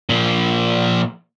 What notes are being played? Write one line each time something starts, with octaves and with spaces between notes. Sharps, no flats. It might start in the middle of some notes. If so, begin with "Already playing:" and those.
A#2 F3